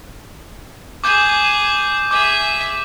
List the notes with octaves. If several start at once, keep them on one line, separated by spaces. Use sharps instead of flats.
G#4 D6 G6
G#4 E5 D6